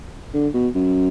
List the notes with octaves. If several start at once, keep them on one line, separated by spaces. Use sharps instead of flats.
D3
B2
F#2